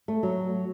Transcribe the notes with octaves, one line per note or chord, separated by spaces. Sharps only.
A3
F#3